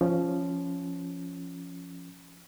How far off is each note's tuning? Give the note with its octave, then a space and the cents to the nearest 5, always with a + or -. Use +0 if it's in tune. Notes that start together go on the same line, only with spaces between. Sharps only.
F3 -10 C#4 +0